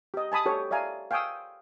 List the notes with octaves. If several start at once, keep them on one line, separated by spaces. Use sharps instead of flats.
G4 D#5
G#5 A5 B5 D#6
G4 A4 C#5
D5 E5 F5 G#5 A#5
F5 G5 G#5 C#6 D#6 E6